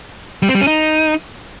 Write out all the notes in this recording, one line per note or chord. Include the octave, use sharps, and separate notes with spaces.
G3
C4
G3
C#4
D#4